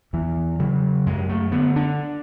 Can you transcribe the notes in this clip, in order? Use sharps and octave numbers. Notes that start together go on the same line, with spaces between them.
E2 E3
C#3 F#3
F#2 G#3
A3
D3 B3
D4